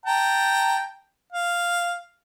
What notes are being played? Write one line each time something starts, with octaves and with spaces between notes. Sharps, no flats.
G5 A5 A#5
F5